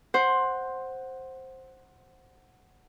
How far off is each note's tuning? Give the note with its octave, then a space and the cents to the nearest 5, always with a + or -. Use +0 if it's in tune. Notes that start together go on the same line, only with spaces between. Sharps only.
C5 +10 F#5 +0